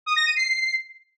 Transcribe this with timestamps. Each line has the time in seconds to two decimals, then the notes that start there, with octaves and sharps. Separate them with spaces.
0.06 D#6
0.16 A#6
0.26 D#7
0.36 C7